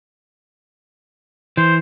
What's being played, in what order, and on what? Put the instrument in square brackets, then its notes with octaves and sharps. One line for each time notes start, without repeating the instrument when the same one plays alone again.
[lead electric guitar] E3 [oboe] C5